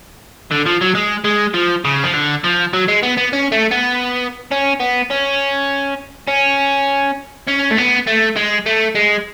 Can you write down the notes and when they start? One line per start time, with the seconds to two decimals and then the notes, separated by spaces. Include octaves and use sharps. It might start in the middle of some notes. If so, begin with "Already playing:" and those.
0.51 D3
0.65 F3
0.81 F#3
0.95 G#3
1.25 G#3
1.54 F3
1.85 C#3
2.04 F3
2.14 D3
2.44 F3
2.73 F#3
2.88 G#3
3.03 B3
3.17 B3
3.33 C#4
3.52 A3
3.71 B3
4.51 C#4
4.80 B3
5.10 C#4
6.28 C#4
7.47 C#4
7.70 A3
7.77 B3
8.07 A3
8.36 G#3
8.66 A3
8.95 G#3